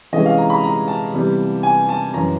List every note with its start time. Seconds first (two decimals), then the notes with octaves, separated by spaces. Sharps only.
0.13 C3 E3 G#3 C#4 D#5
0.26 F5
0.38 A#5
0.50 B5
0.64 A#5
0.88 A5
1.13 C3 E3 G3 B3
1.63 G#5
1.89 A5
2.14 F#2 C#3 E3 A#5